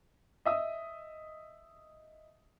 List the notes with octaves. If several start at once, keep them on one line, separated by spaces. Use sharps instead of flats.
D#5 E5 D#6